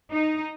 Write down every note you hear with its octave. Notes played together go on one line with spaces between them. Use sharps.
D#4